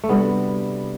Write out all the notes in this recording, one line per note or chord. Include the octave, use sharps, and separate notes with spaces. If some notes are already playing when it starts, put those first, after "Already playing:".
A3
C3 G3 B3 D4 F#4 A4